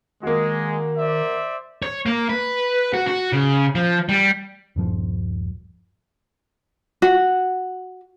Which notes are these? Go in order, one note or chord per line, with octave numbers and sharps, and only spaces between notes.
D#3 G#3 A#3 F#4
C5 D5 E5
C#5
A#3
B4
F#4
F#4
C#3
F3
G3
D#1 G2 F3
F#4